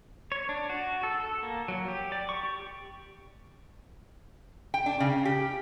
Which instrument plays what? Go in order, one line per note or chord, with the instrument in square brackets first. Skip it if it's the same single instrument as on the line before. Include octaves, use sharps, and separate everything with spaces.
[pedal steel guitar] C#5
D4
F#4
A4
A4
A#3
F#3
G4
D5
C#6
G4
[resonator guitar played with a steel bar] G5
D4
C#3
G4